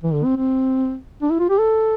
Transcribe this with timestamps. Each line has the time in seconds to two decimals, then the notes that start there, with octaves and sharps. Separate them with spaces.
0.03 E3
0.13 D3
0.24 C4
0.37 C4
1.21 D4
1.30 E4
1.39 F4
1.49 G4
1.58 A4